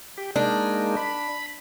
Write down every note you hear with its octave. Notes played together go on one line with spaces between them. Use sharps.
G4
G#3 A#3 D4 D#4
B5